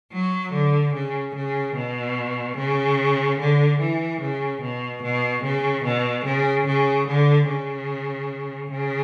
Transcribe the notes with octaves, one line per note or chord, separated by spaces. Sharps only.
F#3
D3
C#3
C#3
B2
C#3
D3
E3
C#3
B2
B2
C#3
B2
C#3
C#3
D3
C#3
C#3